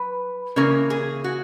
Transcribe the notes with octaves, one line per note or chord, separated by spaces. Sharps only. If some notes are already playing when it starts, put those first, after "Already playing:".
Already playing: F#3 B4
C#3 E3 A#3 C#4 A#4
G#4
F#4